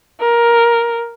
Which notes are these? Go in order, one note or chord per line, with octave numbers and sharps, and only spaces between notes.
A#4